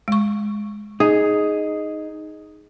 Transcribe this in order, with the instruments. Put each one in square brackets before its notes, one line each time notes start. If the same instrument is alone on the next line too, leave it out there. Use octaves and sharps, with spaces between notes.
[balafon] G#3 C#6
[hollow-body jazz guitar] D#4 [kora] G#4